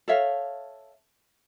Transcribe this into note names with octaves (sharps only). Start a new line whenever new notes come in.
A4 C#5 E5 F5